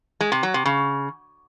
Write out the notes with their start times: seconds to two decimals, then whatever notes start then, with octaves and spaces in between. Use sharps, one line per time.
0.21 G#3
0.32 C3
0.43 F#3
0.54 C3
0.65 C#3